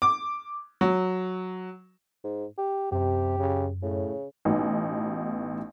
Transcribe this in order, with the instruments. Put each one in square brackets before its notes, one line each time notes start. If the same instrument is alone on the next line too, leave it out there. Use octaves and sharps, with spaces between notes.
[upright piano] D6
F#3
[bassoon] G#2
G4
[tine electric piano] F#2 [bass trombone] C3 [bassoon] G4
[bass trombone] C#3
[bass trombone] A2 [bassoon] C#3
[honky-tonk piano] A1 B2 B3 D#4